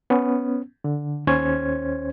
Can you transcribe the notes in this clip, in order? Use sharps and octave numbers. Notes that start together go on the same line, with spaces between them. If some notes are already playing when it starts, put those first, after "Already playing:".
B3 C#4
D3
D#2 C#4 C5 C#5 G#6